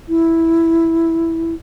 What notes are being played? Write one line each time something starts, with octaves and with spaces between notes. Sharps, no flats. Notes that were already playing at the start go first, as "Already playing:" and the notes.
E4